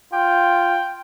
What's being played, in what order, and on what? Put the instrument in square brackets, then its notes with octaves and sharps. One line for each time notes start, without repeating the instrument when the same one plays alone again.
[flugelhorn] F4 [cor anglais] G5